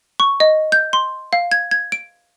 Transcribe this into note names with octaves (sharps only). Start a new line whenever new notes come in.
C#6
D#5
G6
C6
F5
G#6
G#6
D7